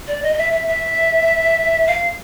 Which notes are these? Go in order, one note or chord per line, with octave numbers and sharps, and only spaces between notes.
D5
D#5
D#5
E5
E5
E5
F5